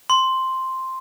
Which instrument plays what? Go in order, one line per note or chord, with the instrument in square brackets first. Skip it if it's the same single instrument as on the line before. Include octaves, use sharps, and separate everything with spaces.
[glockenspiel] C6